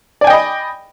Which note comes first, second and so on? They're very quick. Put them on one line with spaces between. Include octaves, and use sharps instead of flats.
D5 G#5 G5 D#5 B5